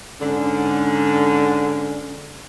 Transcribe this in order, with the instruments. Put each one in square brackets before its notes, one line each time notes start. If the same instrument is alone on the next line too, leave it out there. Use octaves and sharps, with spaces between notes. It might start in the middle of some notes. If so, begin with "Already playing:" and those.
[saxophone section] G#2 D3 [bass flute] C#4